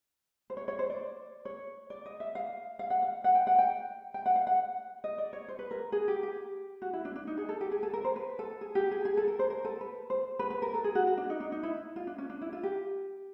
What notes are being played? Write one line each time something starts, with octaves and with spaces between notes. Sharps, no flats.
C5
C#5
C#5
C5
D5
C#5
D5
D#5
E5
F5
F5
F#5
F5
F#5
G5
F#5
G5
G5
F#5
F5
F#5
D#5
D5
C#5
C5
B4
A#4
G#4
G4
G4
F#4
E4
D4
D4
D#4
G#4
A4
G4
G#4
A4
A#4
C5
B4
A4
G#4
G4
G#4
G#4
A4
A#4
C5
A#4
A4
B4
C5
B4
B4
A#4
A4
G#4
F#4
F#4
D4
D#4
D4
D#4
E4
F4
D4
C#4
D4
E4
F4
G4